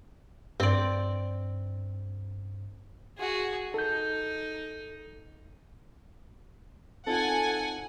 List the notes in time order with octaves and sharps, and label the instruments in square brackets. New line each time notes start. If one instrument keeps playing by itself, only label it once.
[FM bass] G2 [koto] C4 D5
[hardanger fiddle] F#4 G#4
[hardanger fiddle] D#4 [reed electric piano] A4 G6
[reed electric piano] C4 D#4 F4 [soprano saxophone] A4 [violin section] F#5 G#5